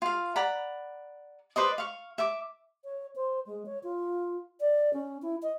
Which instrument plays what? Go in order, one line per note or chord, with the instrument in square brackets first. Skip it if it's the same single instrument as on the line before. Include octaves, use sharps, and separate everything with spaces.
[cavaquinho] F4 F5
D5 F#5 A#5 B5
B4 C5 D5 D#5
F5 C#6
E5 D6
[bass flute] C#5
C5
G#3
C#5
F4
D5
C#4
E4
D#5